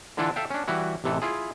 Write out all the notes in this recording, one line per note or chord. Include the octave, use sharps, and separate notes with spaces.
D3 E3 D4 E4 F4 A4
A4 E5 F5 G5
C#4 D4
E3 G3 E4 F#4
A1 C3 E3 A4
E4 F4 G#4